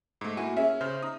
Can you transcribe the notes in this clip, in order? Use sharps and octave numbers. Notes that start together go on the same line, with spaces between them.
G#2 A3
A#3 E4 F#4 G#5
C#4 G#4 E5
C#3 C5 F6
D#4 D#6